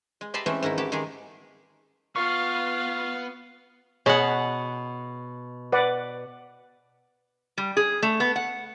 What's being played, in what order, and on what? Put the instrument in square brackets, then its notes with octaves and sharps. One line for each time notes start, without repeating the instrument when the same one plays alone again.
[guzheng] G#3
G4 D#5 E5 A5 B5 C6
E3 G#3 A3 C4 C#4
G#2 D#3 D#4 E4
E4 F#4 G4 A4
D#3 G#3 G4 G#4
[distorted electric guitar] B3 B4 [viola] F4 [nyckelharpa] F5 [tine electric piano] C#6
[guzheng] B2 F#5 [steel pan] G#4 C#5
[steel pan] B4 D5 F#5
[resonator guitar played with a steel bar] G3
G#4
A3
B3
F#5